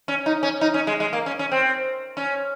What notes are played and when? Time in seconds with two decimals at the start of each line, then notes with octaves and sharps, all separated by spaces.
0.08 C#4
0.26 D#4
0.43 C#4
0.61 D#4
0.74 C#4
0.87 G#3
1.00 G#3
1.13 A#3
1.26 C#4
1.39 C#4
1.52 C4
2.17 C#4